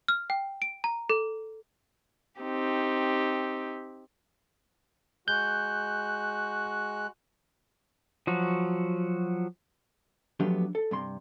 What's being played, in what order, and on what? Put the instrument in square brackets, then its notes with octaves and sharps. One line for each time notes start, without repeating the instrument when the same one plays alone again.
[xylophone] F6
G5
D7
A#5
A4
[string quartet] C4 D#4 G4
[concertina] G#3 F#6 [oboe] F#4 [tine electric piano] G6
[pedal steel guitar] F3 F#3 F#4
[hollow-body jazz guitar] F3 F#3 A3 B3 D4 G4
A4
G2 C3 C6